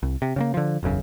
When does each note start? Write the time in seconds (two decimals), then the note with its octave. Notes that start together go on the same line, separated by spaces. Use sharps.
0.03 C2
0.22 C3
0.36 C#3 G3 A#3
0.54 D3 F3
0.83 E1 B1 F#2 C#3